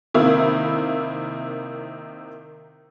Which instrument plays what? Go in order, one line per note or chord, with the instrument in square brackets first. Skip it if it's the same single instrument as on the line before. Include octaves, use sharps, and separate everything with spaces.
[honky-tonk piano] C3 D#3 A#3 E4